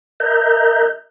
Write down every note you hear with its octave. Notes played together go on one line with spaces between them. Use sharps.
A#4 D#5 E5 A#5 G6